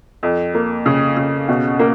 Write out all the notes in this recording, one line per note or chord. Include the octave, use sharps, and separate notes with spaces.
F2
A#3
C#3
C#3
B2
A#3